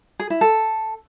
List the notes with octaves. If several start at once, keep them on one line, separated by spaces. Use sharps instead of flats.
G#4
E4
A4